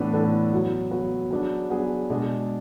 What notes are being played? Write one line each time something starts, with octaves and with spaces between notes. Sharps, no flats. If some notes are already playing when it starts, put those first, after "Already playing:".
Already playing: A2 E3 B3 D4 A4
A2 E3 B3 D4 A4
F#3 B3 F#4
F#3 B3 F#4
F#3 B3 D4 G#4
F#3 B3 D4 G#4
B2 G#3 D4 G#4